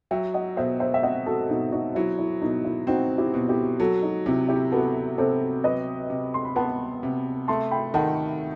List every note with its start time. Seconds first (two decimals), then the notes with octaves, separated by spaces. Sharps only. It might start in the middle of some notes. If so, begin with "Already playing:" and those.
0.11 F#3 E5 G5
0.34 D#5 F#5
0.57 B2 C5 E5
0.80 C5 E5
0.94 E5
1.03 C4 D#5 F#5
1.26 F#4 A4
1.49 B2 D#4 F#4
1.72 D#4 F#4
1.95 F#3 E4
2.18 E4
2.42 B2 D#4
2.65 E4
2.87 C4 D#4 F#4
3.18 E4 G4
3.34 B2
3.49 E4 G4
3.79 F#3 F#4 A4
4.02 D#4 F#4
4.26 C3 E4
4.48 E4 G4
4.72 B3 F#4 A4
5.18 C3 A4 C5
5.64 F#3 B4 D#5
6.10 C3
6.34 C6
6.45 B5
6.56 B3 F#5 A5
7.03 C3
7.48 A3 A5 C6
7.71 G5 B5
7.94 D#3 F#5 A5